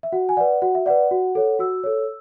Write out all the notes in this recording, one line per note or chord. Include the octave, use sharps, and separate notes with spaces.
E5
F#4 F#5
G#5
B4 D5 F#5
F#4 F#5
E5
B4 D5 F#5
F#4
A4 C#5
F#4 E6
A4 C#5